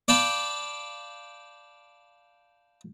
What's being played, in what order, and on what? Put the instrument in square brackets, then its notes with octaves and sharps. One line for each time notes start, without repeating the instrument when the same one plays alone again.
[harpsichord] D5 F5 G5 A5 B5